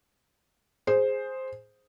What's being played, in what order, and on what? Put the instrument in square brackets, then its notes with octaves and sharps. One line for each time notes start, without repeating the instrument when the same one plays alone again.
[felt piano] G#4 C5